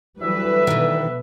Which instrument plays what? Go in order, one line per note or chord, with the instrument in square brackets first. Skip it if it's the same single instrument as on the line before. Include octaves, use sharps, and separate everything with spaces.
[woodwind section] D2 E5 [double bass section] E3 F#3 G3 [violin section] B4
[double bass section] B2 [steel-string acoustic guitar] D#3 E3